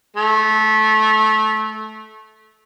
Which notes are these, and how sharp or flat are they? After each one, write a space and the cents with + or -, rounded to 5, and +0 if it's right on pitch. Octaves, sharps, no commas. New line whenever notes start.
A3 -20